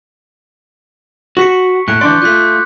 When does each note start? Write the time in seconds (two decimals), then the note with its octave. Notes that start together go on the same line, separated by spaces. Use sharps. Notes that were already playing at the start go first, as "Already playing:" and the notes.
1.37 F#4 C#6 B6 C#7
1.88 A2 F#6 C#7
2.01 E3 D4 D5 C6 D6 G6
2.22 A3 F4 F#6 B6